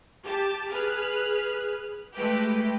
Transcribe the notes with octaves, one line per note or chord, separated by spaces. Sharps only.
G4 A5
G#4 B4 F6 F#6
G#3 A3 G4 B4